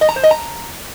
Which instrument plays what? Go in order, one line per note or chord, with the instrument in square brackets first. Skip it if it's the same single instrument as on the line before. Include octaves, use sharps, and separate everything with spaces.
[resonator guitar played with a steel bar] D#5
A#5
C5
D#5
A#5